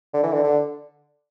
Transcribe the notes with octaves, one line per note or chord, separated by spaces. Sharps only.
D3
E3
D3
D3